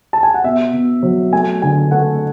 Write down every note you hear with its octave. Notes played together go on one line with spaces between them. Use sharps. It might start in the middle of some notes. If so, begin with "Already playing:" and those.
A5
G#5
F#5
B2 E5
B2
F#3
A3 G#5
D3 G#5
A3 F#5